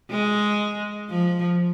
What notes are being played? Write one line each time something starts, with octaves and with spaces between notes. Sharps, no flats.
G#3
F3